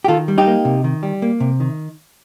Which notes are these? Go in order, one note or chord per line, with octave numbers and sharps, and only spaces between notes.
G4
D#3 F4 A4
G3
D#4 G4
A#3
C3
D#3
G3
A#3
C3
D#3